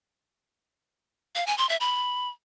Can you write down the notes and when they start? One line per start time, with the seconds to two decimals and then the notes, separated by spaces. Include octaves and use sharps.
1.35 F5
1.47 G#5
1.58 C6
1.69 E5
1.80 B5